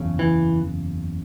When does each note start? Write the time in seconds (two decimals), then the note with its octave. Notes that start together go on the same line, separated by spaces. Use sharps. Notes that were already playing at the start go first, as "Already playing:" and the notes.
Already playing: F#1 E2 C#3
0.19 E3